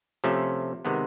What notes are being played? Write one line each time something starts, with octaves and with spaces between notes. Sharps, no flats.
C3 F3 A3 C#4
C3 D#3 G#3 B3